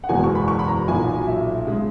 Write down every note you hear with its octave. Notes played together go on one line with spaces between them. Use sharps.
F#5
F#1 E2 B2 G#3 G#5
C#6
B5
C#6
B5
A#5
B1 A#2 F#3 G#5
E5
C#3 G#3